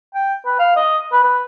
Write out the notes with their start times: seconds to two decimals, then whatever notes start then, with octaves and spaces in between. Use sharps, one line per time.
0.14 G5
0.45 B4
0.59 F5
0.76 D#5
1.12 B4
1.23 B4